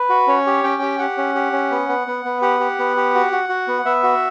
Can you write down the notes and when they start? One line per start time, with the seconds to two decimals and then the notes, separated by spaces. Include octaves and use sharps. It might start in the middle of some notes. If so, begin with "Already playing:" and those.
Already playing: B4
0.10 F#4
0.27 C#4 C#5
0.47 G4
0.64 C#4 G5
0.82 G4
0.99 G4 F#5
1.18 C#4
1.35 G4
1.53 C#4
1.71 B3
1.89 B3
2.07 B3
2.25 B3
2.42 G4 F#5
2.60 G4
2.79 B3
2.97 G4
3.15 F#4
3.32 F#4
3.49 F#4
3.67 B3
3.85 B3 E5
4.03 F#4